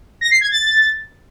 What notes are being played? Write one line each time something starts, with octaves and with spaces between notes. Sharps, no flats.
A#6
C7
G#6
A6